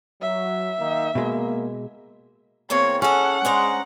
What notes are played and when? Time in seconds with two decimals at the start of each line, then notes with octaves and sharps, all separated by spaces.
0.22 F#3 E5
0.79 D#3 A#3 D#4
1.15 B2 G#3 A#3
2.70 E2 A#3 C4 C#5
3.02 C#4 G#4 A4 F#5
3.45 G#3 D4 C5 A#5